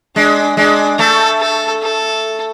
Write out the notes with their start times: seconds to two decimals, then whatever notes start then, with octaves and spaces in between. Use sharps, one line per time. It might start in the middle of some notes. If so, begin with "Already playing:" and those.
0.16 G#3 D4
0.57 G#3 D4
0.99 A3 A4
1.41 A4
1.83 A4